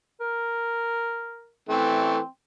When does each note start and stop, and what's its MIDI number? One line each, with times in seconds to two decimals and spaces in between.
0.20 1.53 70
1.69 2.18 52
1.69 2.18 57
1.69 2.26 60